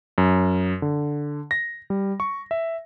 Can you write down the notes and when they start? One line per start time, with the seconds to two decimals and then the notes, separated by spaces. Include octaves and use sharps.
0.18 F#2
0.82 D3
1.51 A#6
1.90 G3
2.20 C#6
2.51 E5